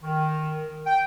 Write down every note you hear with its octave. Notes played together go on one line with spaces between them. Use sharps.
D#3
G5